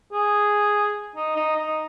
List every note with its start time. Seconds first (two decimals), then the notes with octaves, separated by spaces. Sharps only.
0.12 G#4
1.16 D#4
1.36 D#4
1.56 D#4